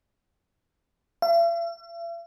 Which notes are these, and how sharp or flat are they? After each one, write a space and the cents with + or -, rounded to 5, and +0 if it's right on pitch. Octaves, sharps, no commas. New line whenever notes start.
E5 +45